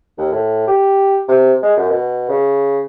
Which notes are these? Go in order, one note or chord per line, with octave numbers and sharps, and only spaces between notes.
D#2
A2
G4
C3
G#3
F#2
B2
C#3